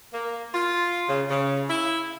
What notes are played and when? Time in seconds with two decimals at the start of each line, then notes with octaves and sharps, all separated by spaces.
0.13 A#3
0.55 F4
1.08 C#3
1.30 C#3
1.69 E4